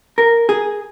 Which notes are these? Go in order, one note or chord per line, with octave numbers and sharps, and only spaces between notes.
A#4
G#4